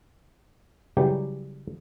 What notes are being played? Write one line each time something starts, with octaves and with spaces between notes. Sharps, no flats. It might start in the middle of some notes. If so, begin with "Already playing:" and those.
C#3 E3 F#3 G3 G4 G5